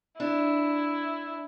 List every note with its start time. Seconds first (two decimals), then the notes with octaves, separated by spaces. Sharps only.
0.20 D4 E4